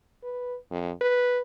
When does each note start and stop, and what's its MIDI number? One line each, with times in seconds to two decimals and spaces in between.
0.23 0.57 71
0.71 0.91 41
1.01 1.42 71